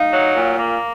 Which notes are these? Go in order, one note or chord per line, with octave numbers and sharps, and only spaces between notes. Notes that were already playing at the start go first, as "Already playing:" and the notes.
Already playing: D#4 F5
F#3
A#2
A#3